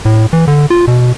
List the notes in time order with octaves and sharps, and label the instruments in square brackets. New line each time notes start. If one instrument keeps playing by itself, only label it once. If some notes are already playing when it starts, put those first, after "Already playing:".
[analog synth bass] A2
E3
D3
F4
B2